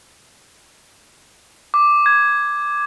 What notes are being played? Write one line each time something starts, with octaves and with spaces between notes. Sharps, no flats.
D6
G#6